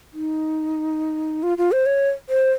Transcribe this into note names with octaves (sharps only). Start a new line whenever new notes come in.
D#4
F4
F4
C5
C#5
C5